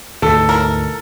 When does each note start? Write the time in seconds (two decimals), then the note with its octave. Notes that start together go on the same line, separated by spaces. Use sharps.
0.22 D2 G#2 B2 A4
0.49 E4 A#4